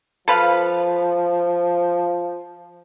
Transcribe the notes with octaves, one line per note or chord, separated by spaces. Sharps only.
F3 A4 B4 F5